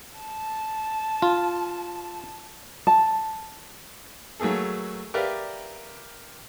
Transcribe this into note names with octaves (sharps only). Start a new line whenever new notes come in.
A5
F4
A5
F#3 A3 A#3 G#4 A4
G4 A#4 B4 D5 E5 F5